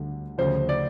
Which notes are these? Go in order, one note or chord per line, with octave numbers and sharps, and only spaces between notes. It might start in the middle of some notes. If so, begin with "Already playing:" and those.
Already playing: D2 D3 G3
D2 C#3 F3 C5
D5